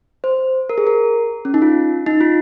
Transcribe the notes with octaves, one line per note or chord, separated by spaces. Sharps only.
C5
A#4
G#4
A#4
C#4
D#4
F4
D#4
F4